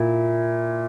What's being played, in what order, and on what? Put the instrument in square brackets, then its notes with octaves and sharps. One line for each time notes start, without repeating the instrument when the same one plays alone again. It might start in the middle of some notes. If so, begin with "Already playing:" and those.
Already playing: [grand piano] A#2 E4